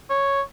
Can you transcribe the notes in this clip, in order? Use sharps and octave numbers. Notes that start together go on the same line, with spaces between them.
C#5